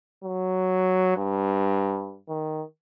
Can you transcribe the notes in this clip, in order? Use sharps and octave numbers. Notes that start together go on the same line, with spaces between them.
F#3
G2
D#3